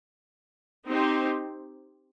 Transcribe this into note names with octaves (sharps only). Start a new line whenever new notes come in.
C4 D#4 G4 C5